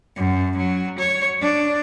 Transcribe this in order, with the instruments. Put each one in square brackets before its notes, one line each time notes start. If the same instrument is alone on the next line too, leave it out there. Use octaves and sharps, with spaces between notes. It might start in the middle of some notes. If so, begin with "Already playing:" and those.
[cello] F#2
F#3
C#5
D4